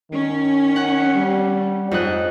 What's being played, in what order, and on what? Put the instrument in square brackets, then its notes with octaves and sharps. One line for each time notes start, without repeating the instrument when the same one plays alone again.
[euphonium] D#3 [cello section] C#4
[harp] F#5
[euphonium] G3
[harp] F2 D#5 F#6 [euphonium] G#2